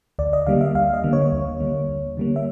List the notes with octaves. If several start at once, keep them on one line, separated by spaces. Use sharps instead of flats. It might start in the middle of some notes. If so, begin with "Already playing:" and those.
D2 D5
D#5
D3 G3 A#3 F5
E5
D2 F5
D#5
D3 G3 A#3
C#5
D2
D3 G3 A#3
D2
D3 G3 A#3
E5